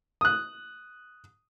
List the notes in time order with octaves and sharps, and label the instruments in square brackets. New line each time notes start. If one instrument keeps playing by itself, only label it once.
[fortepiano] D#6 F#6